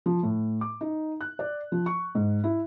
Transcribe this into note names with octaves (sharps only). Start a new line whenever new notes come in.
F3
A2
D6
D#4
F#6
D5
F3
C#6
G#2
E4